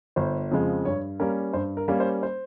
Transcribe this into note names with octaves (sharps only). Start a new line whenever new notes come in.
G1 C5
F2 C#3 F3 G#3
G2 C#5
G3 A#3 C#4 A#4
G2 C5
A#4
G3 A#3 C#4
C5
C5